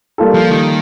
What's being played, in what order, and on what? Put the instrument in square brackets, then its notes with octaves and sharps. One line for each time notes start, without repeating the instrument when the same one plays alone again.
[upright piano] G3 A#3 F4 A4
[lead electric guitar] F3
D#3